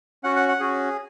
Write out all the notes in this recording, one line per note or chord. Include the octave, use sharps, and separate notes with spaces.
C#4 F#4 F#5
F#5
F#5
C#4 F#4 G#4